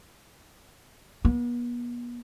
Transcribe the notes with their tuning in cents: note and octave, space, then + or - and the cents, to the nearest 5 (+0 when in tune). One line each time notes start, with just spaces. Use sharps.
B3 -40